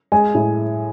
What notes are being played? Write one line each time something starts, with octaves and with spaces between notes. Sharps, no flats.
G#3 G#5
A2